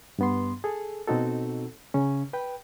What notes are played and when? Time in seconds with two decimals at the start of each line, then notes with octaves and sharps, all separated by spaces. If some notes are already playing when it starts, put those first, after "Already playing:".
0.19 G2 B3 C6
0.64 G#4 A4
1.08 B2 C4 D#4 F#4 A4
1.94 C#3 C#4
2.33 B4 G5